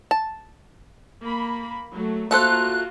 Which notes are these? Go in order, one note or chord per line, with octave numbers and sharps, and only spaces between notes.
A5
A#3 B5
F#3 A3
A3 A#3 F4 F#4 A4 C5 F#6